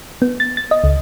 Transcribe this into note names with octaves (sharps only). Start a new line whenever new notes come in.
B3
A6
A6
D#5
C#2